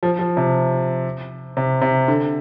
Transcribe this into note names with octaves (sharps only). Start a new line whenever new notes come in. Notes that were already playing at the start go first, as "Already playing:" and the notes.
F3
F3
C3
C3
C3
D3